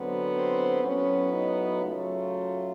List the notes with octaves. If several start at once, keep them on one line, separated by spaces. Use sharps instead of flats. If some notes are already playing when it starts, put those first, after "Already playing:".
Already playing: D3 F#3 B3 C4
C4
A2 F#3 B3 C#4
D#4
C#3 F#3 A3 F4